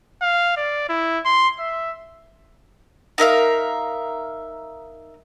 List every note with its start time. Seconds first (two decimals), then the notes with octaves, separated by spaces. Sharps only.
0.22 F5
0.57 D5
0.89 E4
1.25 C6
1.59 E5
3.18 D#4 A#4 E5 F5